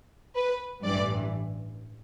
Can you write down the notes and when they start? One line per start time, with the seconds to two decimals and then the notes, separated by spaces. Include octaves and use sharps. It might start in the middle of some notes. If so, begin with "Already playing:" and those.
0.35 B4
0.84 A1 G2 E3 D5